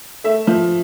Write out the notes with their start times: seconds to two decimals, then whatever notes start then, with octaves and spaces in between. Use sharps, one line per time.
0.24 A3 E5
0.47 F3